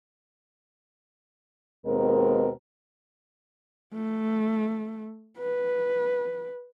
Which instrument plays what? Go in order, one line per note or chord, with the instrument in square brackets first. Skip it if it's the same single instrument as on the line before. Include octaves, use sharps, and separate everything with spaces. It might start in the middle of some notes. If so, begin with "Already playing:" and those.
[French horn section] D#2 B2 G#3 C4 A#4
[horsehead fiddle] A3
B4